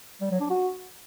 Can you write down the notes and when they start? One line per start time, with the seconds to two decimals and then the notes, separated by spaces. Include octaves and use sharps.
0.21 G3
0.31 F#3
0.40 D4
0.50 F#4